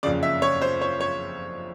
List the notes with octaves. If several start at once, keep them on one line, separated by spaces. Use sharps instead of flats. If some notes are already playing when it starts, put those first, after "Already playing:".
F#1 F2 C#3 D5
E5
C#5
C5
C#5
C#5